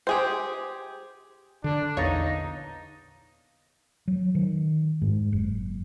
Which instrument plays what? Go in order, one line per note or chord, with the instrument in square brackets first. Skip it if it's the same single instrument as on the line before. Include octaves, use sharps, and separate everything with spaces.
[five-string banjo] G4 G#4 C5
[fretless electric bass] D3 [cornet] D4
[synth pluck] A#1 E2 C#5 [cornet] D#4 [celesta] F5 A6 A#6
[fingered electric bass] F#3
D#3
G#2
F#1